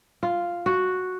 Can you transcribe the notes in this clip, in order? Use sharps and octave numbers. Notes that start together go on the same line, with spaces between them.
F4
F#4